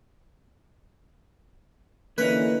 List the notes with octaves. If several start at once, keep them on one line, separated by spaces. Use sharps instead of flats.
D3 E3 A#3 C#4 D#4 B4